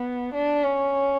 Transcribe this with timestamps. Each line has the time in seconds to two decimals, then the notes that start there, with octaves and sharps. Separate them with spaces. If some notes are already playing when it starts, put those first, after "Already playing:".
Already playing: B3
0.34 D4
0.64 C#4